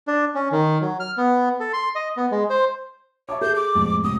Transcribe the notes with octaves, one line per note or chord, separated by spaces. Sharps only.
D4
C#4
D#3
F#3
F6
B3
A4
C6
D#5
B3
G#3
C5
C#5 E5 A5 D6
G#4 A4 G6
D6
F2 A2 G#3
C#2 A2 C3 D#6